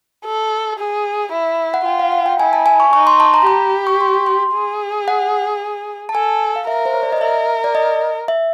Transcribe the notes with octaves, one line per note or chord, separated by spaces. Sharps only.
A4
G#4
E4
F#5
F4 G5
F5
F#5
G5
E4 G#5
A5
G#5
C#6
D#4 C#6
C6
A5
A#5
G4 B5
C#6
C6
C6
G#4
F#5
A5
A4 G#5
F5
A#4 E5
C5
C#5
D5
D#5
A#4 E5
D5
D#5
E5